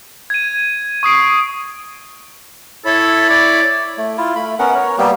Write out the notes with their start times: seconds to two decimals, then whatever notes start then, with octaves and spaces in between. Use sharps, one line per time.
0.30 G#6 D#7
1.03 C#6 D#6 C7 D7
2.85 E4 A4 C#5 B5
3.30 D5
3.97 A3
4.18 E4 F4
4.36 A3 B5
4.59 B3 C#4 A#4 F#5
4.75 A#4 C#5
4.98 G3 A#3 B3 G4